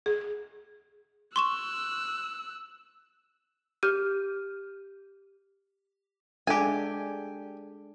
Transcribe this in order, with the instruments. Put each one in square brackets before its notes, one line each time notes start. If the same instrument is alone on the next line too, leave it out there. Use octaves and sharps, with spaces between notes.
[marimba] G#4
[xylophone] C6 C#6 E7 [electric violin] E6 F#6
[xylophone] G4 F6 G6 D#7
[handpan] G#3 D4 A4 [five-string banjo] G4 G#5